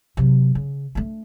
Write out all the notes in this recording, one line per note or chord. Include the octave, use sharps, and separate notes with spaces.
C3 F#3
C#3
A3 D4